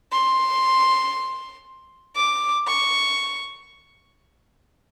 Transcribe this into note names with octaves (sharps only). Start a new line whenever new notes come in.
C6
D6
C#6